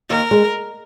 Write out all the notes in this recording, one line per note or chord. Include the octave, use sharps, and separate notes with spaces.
D#2 A#4
G#3